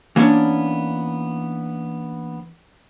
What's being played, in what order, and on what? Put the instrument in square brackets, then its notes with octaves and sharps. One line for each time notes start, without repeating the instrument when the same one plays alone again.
[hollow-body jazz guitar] E3 A#3 B3 C#4 D4